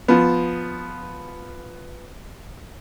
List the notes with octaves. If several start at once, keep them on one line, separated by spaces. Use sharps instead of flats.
F3 B3